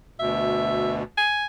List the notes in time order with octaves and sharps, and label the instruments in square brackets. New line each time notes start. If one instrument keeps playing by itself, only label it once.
[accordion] D2 B2 [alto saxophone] E5
[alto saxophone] G#5